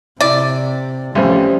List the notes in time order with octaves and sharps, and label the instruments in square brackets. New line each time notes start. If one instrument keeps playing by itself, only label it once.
[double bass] C3 [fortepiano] E4 [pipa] D5
[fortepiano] A1 F2 [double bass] F3 [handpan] G3 C#4 C5